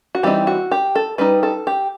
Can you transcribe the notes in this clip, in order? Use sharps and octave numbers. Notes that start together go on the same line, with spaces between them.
F#4
E3 G3 C4 D#4 G4
F#4
G4
A4
G3 D#4 B4
A4
G4